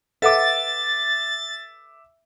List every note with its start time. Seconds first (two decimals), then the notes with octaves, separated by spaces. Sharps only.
0.22 A4 B4 E5 F#5 D6 A6